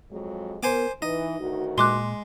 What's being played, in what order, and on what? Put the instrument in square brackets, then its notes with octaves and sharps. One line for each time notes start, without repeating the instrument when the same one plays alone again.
[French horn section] F2 F#3 G#3
[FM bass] B3 [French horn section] A#4 [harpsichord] C5 G#5 D6
[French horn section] E3 [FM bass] D#4 [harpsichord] D#5
[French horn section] D2 D#3 F#4
[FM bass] A#2 [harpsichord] G#3 [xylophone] C6 D6 F#6